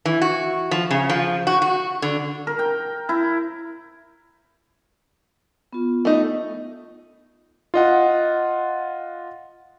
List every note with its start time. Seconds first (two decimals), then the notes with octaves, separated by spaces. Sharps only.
0.05 E3
0.21 F#4
0.71 F3
0.91 C#3
1.10 F3
1.47 F#4
1.62 F#4
2.02 D3
2.47 A#4
2.59 G5
3.09 E4
5.73 B3 F4
6.05 A3 D#4
7.74 F4 D#5 F#5